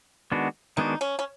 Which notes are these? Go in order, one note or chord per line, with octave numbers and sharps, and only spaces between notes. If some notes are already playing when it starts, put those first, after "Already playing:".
D#3 G#3 B3 D4 F#4
D#3 G#3 B3 D4 D#4 F#4
C#4
C#4